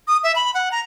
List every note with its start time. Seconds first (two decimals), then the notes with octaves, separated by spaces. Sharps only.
0.08 D#6
0.23 E5
0.36 B5
0.54 F#5
0.72 A#5